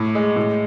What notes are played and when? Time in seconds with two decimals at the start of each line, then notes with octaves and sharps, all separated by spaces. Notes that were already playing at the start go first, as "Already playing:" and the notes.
Already playing: A2 D6
0.15 G#3
0.36 A2